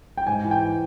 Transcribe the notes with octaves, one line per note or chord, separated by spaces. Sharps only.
G5
G#2 G#5
E3
G5